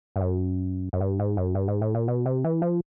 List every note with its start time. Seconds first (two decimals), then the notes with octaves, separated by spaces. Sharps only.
0.16 G2
0.21 F#2
0.93 F#2
1.01 G2
1.20 G#2
1.37 F#2
1.55 G2
1.68 G#2
1.82 A2
1.95 A#2
2.08 B2
2.26 C3
2.44 E3
2.62 F3